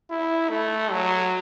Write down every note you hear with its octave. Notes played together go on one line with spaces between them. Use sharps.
E4
A3
F#3